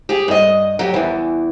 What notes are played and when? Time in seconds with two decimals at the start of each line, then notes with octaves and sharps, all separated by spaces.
0.09 G4 G#4
0.28 G2 D#5
0.79 F#3 G4
0.94 E2 E3